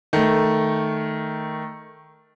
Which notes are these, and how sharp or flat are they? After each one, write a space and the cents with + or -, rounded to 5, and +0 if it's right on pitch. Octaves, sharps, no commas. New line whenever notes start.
D#3 +0 A3 +0